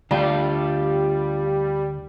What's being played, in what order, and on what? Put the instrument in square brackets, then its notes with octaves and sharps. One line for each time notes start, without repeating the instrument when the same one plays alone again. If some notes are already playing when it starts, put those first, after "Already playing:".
[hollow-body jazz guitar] D2 [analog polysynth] G3 [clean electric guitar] D4 F4